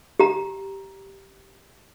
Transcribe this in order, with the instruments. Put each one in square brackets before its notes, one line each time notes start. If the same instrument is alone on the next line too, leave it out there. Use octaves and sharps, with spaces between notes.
[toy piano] G4 A#5